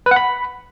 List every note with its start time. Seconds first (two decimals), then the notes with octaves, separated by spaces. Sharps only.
0.06 B4
0.11 F#5
0.16 B5